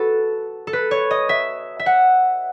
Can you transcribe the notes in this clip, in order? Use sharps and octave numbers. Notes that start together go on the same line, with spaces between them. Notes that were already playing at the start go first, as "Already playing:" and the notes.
Already playing: F#4 A4 B4
A4
B4
C#5
D#5
E5
E5
F#5